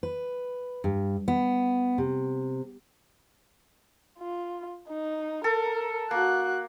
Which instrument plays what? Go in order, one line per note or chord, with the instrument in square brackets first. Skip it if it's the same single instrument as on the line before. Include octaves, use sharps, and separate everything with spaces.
[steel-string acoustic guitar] B4
G2
B3
C3
[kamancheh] F4
D#4
[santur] A4 [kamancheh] A#4
[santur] A#3 [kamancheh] F#4 F#6